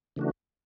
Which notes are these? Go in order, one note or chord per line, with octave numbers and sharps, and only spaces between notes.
C#3 E3 A3 D4 F#4